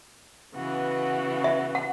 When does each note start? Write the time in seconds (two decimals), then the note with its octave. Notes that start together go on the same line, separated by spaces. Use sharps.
0.54 C#3 E3 B3 F#4
1.44 E5
1.75 F#5